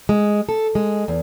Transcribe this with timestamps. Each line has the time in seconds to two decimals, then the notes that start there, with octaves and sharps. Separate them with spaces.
0.09 G#3
0.49 A4
0.75 G#3
1.08 E2